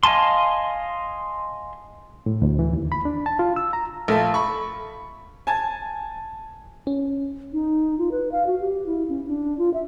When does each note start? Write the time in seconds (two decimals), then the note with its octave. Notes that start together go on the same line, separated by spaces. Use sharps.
0.03 D#5 F5 G#5 A5 C6
2.26 A2
2.42 D2
2.59 E3
2.73 D#2
2.92 B5
3.05 D4
3.26 A5
3.39 F4
3.56 E6
3.73 A#5
4.08 A#1 A3 F4 A5
4.34 B5 C#6
5.47 G#5 A5 G#6
6.87 C#4
7.53 D#4
7.98 F4
8.11 B4
8.32 F5
8.46 F#4
8.60 G4
8.86 E4
9.09 C#4
9.27 D4
9.58 F4
9.74 E5